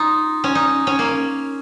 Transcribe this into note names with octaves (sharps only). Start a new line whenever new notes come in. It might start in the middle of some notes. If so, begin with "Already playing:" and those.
Already playing: D#4 F4
C#4
D#4
C#4
A#3